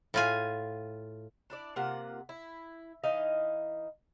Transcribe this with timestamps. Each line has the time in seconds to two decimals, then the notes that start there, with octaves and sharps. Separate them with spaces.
0.14 A2 F4 G#5
1.50 D4 E4 D5
1.76 C3 A#3 F4 F#5
2.29 E4
3.04 E3 D#4 D#5 F5